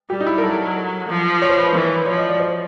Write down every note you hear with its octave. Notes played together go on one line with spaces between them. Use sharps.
G3 G4
D#4
E4
A#4
F#3 A4
F3
C#5
C5
B4
C5
E3
F3 C#5
D#5
D5
C5